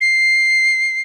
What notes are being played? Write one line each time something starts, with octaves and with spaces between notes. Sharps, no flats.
C7